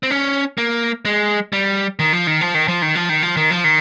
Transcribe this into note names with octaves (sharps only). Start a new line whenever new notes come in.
C4
C#4
A#3
G#3
G3
D#3
F3
D#3
F3
D#3
F3
D#3
F3
D#3
F3
D#3
F3
D#3